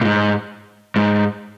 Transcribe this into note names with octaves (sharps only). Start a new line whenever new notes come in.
A#2
G#2
G#2